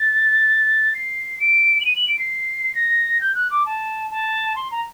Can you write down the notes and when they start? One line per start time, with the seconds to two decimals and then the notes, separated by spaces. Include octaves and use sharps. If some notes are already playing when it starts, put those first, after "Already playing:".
Already playing: A6
0.95 C7
1.40 D7
1.81 F#7
1.85 D#7
1.96 F#7
2.08 D7
2.19 C7
2.75 A#6
3.21 G6
3.35 F#6
3.51 D6
3.66 A5
4.11 A5
4.56 C6
4.71 A#5